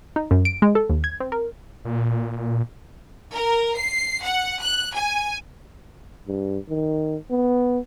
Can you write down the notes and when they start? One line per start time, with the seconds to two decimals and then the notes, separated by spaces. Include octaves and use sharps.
0.16 D#4
0.31 F#2
0.45 D7
0.62 G#3
0.75 A4
0.90 D#2
1.04 G#6
1.20 C4
1.32 A#4
1.85 A#2
3.33 A#4
3.77 C7
4.23 F#5
4.62 F#6
4.95 G#5
6.28 G2
6.69 D#3
7.31 B3